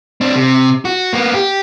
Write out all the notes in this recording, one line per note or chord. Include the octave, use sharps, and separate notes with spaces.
C4 D4
C3
F#4
A#3 B3
G4